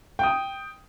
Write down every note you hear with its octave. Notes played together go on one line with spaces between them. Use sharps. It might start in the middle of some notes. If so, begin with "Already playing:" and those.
G5 D#6